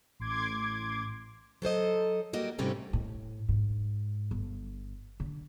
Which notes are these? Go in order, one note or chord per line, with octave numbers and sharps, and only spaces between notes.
A1 C6 D6 G#6
F#3 A4 C5 D#5
G3 A#3 F#4 D#5
G#2 C3 G3 A3 C#4 G4
A2
G#2
G1
D3